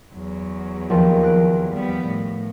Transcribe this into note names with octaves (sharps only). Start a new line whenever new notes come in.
E2 F#3
D#2 F3
F#6 A#6 D7
G3 B3
A2